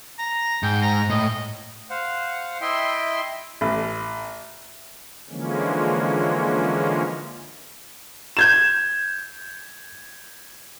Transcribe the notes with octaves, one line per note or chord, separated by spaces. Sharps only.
A#5
G#2 G5
A#5
A2 D#5
C5 F5 F#5
E4 D#5 E5 G5 C6
A1
D3 E3 F3 G#3 A#3 C#4
G6 G#6 E7